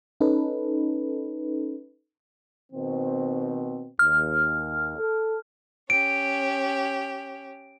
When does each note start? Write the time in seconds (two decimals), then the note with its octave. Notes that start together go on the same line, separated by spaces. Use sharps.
0.21 C#4 D#4 A4 B4
2.72 B2 D#3 C4
3.99 D#2 F6
4.99 A4
5.90 C#4 G4 D7